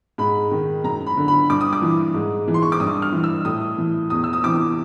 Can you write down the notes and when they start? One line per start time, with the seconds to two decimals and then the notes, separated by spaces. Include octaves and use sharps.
0.18 G#2 B5
0.51 D#3
0.84 F#2 A#5
1.07 B5
1.17 D3
1.28 B5
1.50 G2 D6
1.61 D#6
1.73 D6
1.82 E3
2.14 G#2
2.48 E3
2.54 C6
2.62 C#6
2.72 D6
2.80 G2 D#6
3.02 F6
3.12 E3
3.24 E6
3.45 A2 D#6
3.78 E3
4.10 E2 D#6
4.24 E6
4.33 D#6
4.43 C3 E3 D6